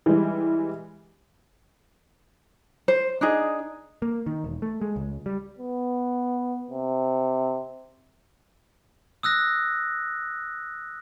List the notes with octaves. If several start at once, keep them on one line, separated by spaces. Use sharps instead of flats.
E3 G3 G#3
C5
D4 D#4 G#4
A#3
D#3
E1
A3
G#3
C#2
G3
B3
C3
D#6 E6 F#6 A#6